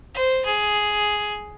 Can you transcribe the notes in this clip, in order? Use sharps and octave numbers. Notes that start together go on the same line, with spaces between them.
C5
G#4